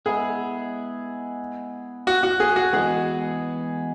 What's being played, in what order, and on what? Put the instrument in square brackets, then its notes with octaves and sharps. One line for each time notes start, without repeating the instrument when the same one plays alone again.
[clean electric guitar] G#3 B3 E4 [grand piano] G#4
[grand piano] F#4
F#4
G#4
F#4
[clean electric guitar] E3 G#3 B3 [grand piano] G#4